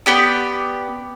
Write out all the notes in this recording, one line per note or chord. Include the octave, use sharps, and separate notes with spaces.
B3 G4 D5